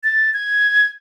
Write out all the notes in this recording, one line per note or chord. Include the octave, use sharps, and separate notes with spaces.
A6
G#6